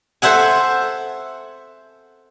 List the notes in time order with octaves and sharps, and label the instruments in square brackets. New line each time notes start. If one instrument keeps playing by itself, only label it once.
[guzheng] A4 C5 E5 F#5 G#5